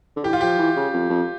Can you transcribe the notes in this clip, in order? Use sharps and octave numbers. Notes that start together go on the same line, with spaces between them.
D3
E3 G4
F4
F3 G4
E3
C#3
F2
F2